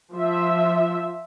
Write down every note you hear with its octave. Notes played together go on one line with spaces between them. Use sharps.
F3 E5